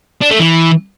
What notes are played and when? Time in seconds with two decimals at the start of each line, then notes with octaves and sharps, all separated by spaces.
0.22 D4
0.31 A3
0.40 E3